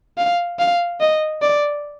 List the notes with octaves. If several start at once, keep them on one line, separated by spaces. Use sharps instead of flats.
F5
F5
D#5
D5